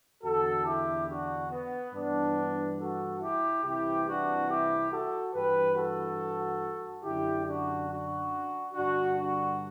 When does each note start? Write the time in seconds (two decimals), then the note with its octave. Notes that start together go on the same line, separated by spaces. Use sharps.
0.23 E2 D3 F#4 A4
0.65 E4 G4
1.08 D4 F#4
1.51 B3
1.93 G2 E3 B3 D4
2.78 F#4 A4
3.21 E4 G4
3.63 C2 C3 E3 E4 G4
4.06 D4 F#4
4.48 E4 G4
4.91 F#4 A4
5.33 G2 E3 G4 B4
5.75 F#4 A4
7.04 F#2 D3 E4 G4
7.46 D4 F#4
7.89 D4 F#4
8.73 G2 D3 D4 F#4
9.16 D4 F#4